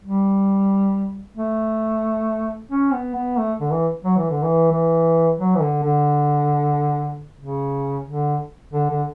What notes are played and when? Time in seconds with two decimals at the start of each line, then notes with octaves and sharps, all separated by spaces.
0.03 G3
1.37 A3
2.71 C#4
2.93 B3
3.15 B3
3.37 A3
3.60 D3
3.71 E3
4.04 F#3
4.17 E3
4.30 D3
4.43 E3
4.72 E3
5.39 F#3
5.55 E3
5.61 D3
5.83 D3
7.39 C#3
8.06 D3
8.73 D3
8.90 D3